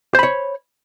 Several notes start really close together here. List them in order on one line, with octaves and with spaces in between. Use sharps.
C5 B5 C#5